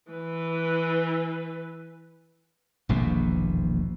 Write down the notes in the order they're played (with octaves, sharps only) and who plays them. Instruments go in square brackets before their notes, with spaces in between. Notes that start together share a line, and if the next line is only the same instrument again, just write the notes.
[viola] E3 B4
[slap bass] D#1 A#1 E2 B2